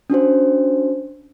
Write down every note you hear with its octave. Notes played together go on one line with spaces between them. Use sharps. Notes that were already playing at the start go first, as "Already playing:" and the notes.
C#4 D4 F#4 C5